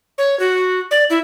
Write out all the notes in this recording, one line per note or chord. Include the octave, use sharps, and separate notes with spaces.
C#5
F#4
D5
E4